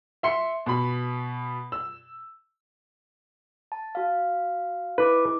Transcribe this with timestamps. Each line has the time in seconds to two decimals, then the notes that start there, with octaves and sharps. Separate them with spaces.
0.23 E5 C6 C#7
0.66 B2 B5
1.72 E6
3.72 A5
3.95 F#4 F5
4.98 D#4 E4 B4 D6